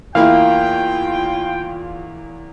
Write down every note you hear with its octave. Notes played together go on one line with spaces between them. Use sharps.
E2 A#3 E4 F4 F5 G5